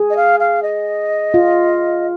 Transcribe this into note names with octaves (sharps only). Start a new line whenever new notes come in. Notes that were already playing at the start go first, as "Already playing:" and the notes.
Already playing: G#4
D#5
F5
F5
D#5
F4